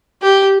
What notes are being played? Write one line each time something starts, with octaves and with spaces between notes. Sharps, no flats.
G4